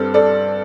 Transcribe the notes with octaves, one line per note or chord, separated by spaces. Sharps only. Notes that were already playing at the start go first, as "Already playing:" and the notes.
Already playing: G2 G3 C4 A4
A4 D5